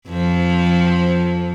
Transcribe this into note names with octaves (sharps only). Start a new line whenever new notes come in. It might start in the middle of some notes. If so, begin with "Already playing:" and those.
F2 F3